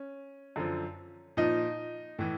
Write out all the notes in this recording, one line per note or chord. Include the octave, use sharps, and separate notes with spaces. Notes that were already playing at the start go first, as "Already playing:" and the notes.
Already playing: C#4
F#2 D3 F3
A#2 F3 D#4
A2 E3